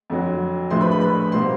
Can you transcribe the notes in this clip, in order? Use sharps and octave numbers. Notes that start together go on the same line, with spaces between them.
F2 D3 F#3
A#1 A2 F3 A3 D4 C5 C6
B4 B5
B4 B5
B4 B5
B2 G3 A#3 C5 C6